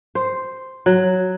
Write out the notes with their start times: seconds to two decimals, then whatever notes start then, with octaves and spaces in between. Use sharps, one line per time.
0.15 C5
0.86 F#3